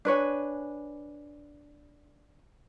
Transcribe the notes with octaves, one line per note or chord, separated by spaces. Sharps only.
D4 B4 C#5 G#5